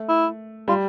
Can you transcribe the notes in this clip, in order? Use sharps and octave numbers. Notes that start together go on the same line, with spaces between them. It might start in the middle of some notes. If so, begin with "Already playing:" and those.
Already playing: A3
E4
G3 F4